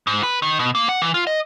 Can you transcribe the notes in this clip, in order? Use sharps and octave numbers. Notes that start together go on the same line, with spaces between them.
G#2
B4
D#3
B2
A#3
F#5
E3
F4
D#5